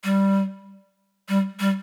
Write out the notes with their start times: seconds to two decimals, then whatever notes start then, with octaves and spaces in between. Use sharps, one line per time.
0.04 G3
1.29 G3
1.60 G3